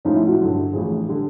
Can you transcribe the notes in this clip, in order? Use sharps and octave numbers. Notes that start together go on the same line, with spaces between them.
A2 F3 G#3 C#4 D#4
E4
F#4
G2 D3 F#3
A1 A2 F3 G#4
D3 G3